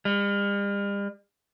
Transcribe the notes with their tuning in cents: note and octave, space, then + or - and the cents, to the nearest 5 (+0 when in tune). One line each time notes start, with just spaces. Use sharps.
G3 +45